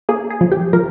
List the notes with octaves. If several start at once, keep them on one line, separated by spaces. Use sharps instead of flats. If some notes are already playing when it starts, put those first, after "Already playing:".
A#3 G#4
G#4
F3
G4
F3 A#4